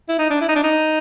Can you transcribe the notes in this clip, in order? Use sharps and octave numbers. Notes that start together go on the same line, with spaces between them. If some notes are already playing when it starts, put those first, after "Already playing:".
E4
D#4
D4
E4
D#4
D4
D#4